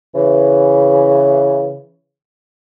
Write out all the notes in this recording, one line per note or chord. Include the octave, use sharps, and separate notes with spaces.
C#3 E3